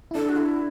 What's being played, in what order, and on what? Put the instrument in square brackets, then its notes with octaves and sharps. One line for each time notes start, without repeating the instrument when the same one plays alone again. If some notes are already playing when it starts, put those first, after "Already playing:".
[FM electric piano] E4
[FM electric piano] D4 [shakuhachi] A4
[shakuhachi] F#4
E4